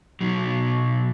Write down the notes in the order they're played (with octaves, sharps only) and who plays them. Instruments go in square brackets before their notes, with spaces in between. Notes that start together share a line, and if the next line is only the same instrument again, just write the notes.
[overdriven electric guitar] B1 F#3